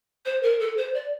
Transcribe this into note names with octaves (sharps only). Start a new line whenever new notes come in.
C5
A#4
A4
C5
D5